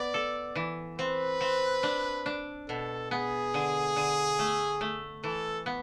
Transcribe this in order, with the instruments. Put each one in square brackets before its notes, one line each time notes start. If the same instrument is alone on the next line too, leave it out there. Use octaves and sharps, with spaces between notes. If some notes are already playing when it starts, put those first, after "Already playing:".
Already playing: [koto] B3 [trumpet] D5
[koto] A4
E3
[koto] C4 [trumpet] B4
[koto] C4
D4
D4
[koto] B2 [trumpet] A4
[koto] B3 [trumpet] G#4
[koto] D3
D3
A3
A3
[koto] E3 [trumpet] A4
[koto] B3